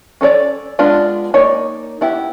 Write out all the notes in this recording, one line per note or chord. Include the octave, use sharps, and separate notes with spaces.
C#4 A4 C#5 D5
G#3 B3 D4 F4
A#3 D#4 C#5 D5
B3 E4 G4